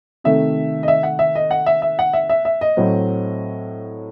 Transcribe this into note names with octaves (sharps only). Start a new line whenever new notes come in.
C3 D#3 A3 E5
D#5
E5
F#5
E5
D#5
F#5
E5
E5
F#5
E5
E5
E5
D#5
A2 F#3 C4